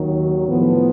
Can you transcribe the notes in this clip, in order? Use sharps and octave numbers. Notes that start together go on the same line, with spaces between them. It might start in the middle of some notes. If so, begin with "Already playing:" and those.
Already playing: D#2 D#3 F#3
A2 F3 B3